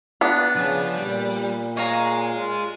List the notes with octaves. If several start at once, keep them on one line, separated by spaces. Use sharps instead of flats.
B3 D4
C#3 F3 C#4
A#2 G3
G#4 C#5 D#5 F5 A#5
F4